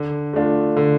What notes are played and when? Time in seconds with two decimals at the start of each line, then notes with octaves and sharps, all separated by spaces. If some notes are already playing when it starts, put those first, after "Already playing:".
Already playing: D3
0.33 A3 D4 F4
0.76 D3